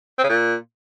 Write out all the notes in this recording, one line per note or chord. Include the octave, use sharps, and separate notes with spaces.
C4
C#3
A#2